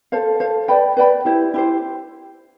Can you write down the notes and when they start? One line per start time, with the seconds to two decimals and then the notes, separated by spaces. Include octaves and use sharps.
0.12 A4 C5 F5
0.40 A4 C5 F5
0.68 B4 D5 G5 B5
0.97 B4 D5 G5 B5
1.25 E4 G4 C5
1.54 E4 G4 C5